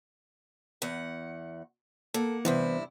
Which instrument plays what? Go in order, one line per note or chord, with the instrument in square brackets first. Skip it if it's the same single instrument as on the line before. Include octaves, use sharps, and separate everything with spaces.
[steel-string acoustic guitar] E2 F#5
[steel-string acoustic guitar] A#3 F#5 [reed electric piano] A4
[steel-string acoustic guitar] G2 C3 E4 [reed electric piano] E3 B3 C5